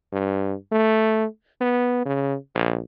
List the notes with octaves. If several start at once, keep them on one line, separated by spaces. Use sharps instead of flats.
G2
A3
B3
C#3
A#1